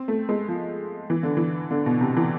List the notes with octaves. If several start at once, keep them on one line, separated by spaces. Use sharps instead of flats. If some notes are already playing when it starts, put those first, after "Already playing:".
Already playing: C4
A3
G#3
F3
E3
D3
E3
D3
B2
C3
E3